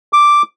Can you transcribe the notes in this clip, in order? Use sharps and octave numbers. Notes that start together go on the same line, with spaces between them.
D6